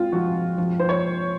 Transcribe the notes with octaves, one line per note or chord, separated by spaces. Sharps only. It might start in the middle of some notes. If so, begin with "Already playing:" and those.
Already playing: G#3 C4 F4
F3 F#4
F3
C5
C#5